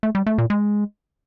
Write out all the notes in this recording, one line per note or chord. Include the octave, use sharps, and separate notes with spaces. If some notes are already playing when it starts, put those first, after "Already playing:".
A3
G3
A3
A#2
G#3